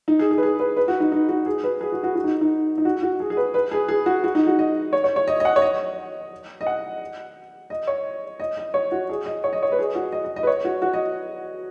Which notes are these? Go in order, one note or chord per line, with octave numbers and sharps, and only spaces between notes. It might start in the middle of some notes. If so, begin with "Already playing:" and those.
D#4
G#4
G#4
B4
G#4
B4
B4
F#4
D#4
D#4
F#4
G#4
B4
G#4
F#4
F#4
F#4
D#4
D#4
D#4
F#4
F#4
G#4
G#4
B4
B4
G#4
G#4
F#4
F#4
D#4
F#4
D#5
C#5
C#5
C#5
D#5
D#5
F#5
C#5
D#5
D#5
F#5
D#5
C#5
D#5
D#5
C#5
F#4
G#4
D#5
C#5
D#5
C#5
B4
G#4
F#4
D#5
D#5
D#5
B4
C#5
F#4
F#4
D#5